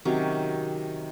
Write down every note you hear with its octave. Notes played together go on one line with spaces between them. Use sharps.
C3 D#3 F#3 C#4